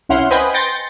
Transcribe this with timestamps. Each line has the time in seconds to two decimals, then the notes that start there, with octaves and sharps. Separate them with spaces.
0.09 C2 C#4 E4 F#5 C6 F6
0.30 B4 C5 D#5 G5 G#5 B5
0.54 G5 C6 G6 A6 A#6 C#7